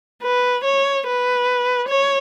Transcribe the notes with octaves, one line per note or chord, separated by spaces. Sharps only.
B4
C#5
B4
C#5